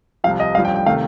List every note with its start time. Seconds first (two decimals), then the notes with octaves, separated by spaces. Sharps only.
0.24 C2 C3 F3 F5
0.40 D#5
0.54 A1 G2 F3 F5
0.65 G5
0.76 G5
0.86 C3 D#3 A3 F5